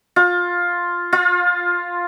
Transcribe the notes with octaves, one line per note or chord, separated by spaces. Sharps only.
F4
F4